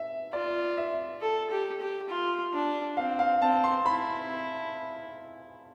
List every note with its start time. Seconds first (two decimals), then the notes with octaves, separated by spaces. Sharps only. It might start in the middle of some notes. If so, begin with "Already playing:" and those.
Already playing: E5
0.33 F4 D5
0.77 E5
1.22 A4
1.50 G4
1.80 G4
2.09 F4
2.53 D4
2.97 C4 F5
3.19 F5
3.42 C4 A5
3.64 C6
3.86 E4 B5